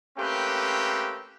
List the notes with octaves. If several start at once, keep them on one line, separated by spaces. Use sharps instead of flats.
A3 A#3 C4 C#4 G4 B4